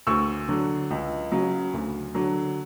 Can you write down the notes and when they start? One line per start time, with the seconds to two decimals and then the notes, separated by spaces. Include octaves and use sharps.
0.07 D2 C#6 E6
0.48 D3 F#3
0.91 C#2
1.32 C#3 F#3
1.74 D2
2.15 D3 F#3